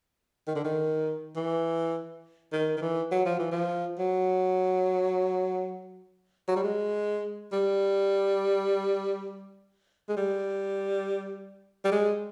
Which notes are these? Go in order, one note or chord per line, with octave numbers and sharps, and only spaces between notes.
D#3
D3
D#3
E3
D#3
D#3
E3
F#3
F3
E3
F3
F#3
F#3
G3
G#3
G3
G#3
G3
G3
G#3